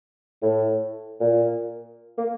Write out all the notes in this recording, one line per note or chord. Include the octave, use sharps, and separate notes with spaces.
A2
A#2
A#3